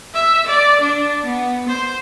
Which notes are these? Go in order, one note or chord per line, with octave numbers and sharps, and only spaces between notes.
E5
D5
D4
B3
C5